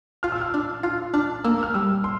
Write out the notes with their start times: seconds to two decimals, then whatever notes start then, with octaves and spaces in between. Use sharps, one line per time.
0.23 F4 F6
0.32 E6
0.41 F6
0.54 D4
0.83 F4 F6
1.14 D4 F6
1.44 A#3 E6
1.63 F6
1.74 G3 E6
2.04 C6